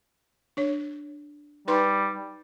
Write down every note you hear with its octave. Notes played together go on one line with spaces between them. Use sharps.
D4 C#5
G3 D#4 B4 C6